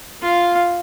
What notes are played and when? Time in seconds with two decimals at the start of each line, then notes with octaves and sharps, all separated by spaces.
0.22 F4 F5